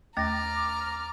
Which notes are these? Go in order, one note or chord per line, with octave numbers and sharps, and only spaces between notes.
D#2 A3 G5 A#5 D6 F6 A6 A#6